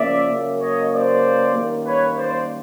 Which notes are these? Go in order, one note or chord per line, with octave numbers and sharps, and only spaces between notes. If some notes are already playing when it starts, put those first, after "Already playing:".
Already playing: C#3 F3 A#3 C#4 D5 E5
C#3 F#3 A#3
C#5 D#5
C5 D5
F#2 D#3 G3 A#3
B4 C#5
C5 D5